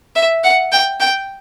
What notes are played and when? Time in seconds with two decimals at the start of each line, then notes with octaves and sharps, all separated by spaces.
0.16 E5
0.44 F#5
0.72 G5
1.00 G5